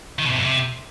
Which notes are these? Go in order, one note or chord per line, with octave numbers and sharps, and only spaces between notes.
D#3
B2
C3
F2
C3